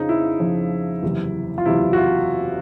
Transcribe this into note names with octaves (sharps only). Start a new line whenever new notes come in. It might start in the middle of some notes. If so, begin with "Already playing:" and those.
Already playing: F2 C#3 F3 D#4
E4
F2 C#3 F3
F#1 E2 C3
F4
F#1 E2 C3 E4
F#4
F4